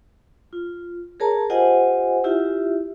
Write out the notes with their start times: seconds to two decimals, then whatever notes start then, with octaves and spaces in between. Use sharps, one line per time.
0.53 F4
1.20 G#4 A#4 C#5 A5 A#5
1.50 F4 G4 C5 D#5 F#5 G#5
2.24 E4 F4 G4 E5